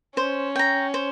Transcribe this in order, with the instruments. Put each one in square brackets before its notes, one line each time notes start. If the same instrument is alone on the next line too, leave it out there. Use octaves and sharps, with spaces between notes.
[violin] C#4 [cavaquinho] C5
[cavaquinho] G5 A#5
C5